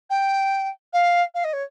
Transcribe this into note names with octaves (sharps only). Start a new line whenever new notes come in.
G5
F5
F5
D#5
C#5